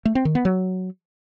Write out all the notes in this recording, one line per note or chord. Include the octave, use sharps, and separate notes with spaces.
A3
C4
D#3
B3
F#3